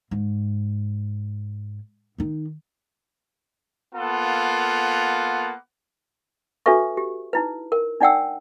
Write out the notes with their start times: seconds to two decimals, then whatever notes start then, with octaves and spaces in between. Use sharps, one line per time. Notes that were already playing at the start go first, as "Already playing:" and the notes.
0.11 G#2
2.18 D#3 D#4
3.95 A#3 B3 F4 A4 F#5
6.66 D4 F#4 A4 B4 E5 C#6
6.97 G4
7.33 D#4 E4 B4
7.72 A#4
8.00 D4 D#4 D5 F#5 G5 E6